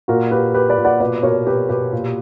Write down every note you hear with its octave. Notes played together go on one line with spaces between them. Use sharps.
A#2 F#4 A#4
A#2 G4 B4
A#2 G4 B4
B4 D5
A#2
D5 F#5
B2 B4 D5
B2 A#4 C#5
B2 G4 B4
B2 G4 B4
A#2